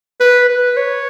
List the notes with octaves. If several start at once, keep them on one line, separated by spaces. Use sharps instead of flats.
B4
B4
C#5